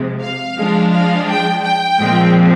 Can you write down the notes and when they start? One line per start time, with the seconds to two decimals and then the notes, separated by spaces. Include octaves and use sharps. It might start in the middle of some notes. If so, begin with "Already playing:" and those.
Already playing: C3 F3 G#3
0.21 F5
0.56 F3 G#3 D4
0.92 F5
1.28 G5
1.63 G5
1.98 A#2 F3 G#3 C4